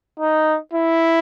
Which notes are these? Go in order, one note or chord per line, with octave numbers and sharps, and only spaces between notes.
D#4
E4